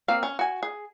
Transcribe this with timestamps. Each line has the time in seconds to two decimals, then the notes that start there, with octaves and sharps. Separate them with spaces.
0.08 A#3 C4 F5
0.23 C#4
0.39 F#4 G#5
0.63 G#4